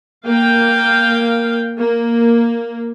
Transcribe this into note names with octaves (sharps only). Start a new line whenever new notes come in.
A#3 F5 G5
A#3